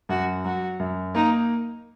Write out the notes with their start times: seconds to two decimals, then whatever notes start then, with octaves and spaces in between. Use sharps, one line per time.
0.09 F#2 F#4
0.45 F#3 F#4
0.80 F#2
1.15 A#3 D#4